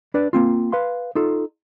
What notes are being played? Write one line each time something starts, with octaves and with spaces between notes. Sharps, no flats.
D4 B4 D5
A#3 C4 F4
B4 F5 C6
D#4 F4 A4